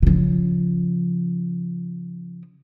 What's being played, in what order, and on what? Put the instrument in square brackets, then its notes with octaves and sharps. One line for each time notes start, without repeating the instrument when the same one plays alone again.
[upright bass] C#3 F3